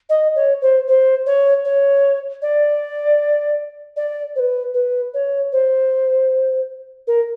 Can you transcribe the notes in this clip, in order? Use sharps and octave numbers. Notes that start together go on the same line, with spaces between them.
D#5
C#5
C5
C5
C#5
C#5
D5
D5
C5
B4
B4
C#5
C5
A#4